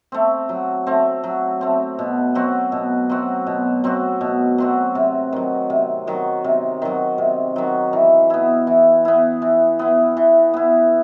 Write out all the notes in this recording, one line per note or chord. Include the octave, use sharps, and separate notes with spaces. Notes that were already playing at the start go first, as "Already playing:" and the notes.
A3 C4
F#3
A3 C4
F#3
A3 C4
B2
F#3 C4 F#4
B2
F#3 C4 F#4
B2
F#3 C4 F#4
B2
F#3 C4 F#4
C3
D#3 F#3
C3
D#3 F#3
C3
D#3 F#3
C3
D#3 F#3
E3
B3 E4
E3
B3 E4
E3
B3 E4
E3
B3 E4